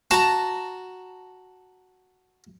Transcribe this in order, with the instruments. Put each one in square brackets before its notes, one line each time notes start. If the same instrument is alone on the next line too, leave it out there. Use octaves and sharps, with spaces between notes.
[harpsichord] F#4 [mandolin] A5 A#5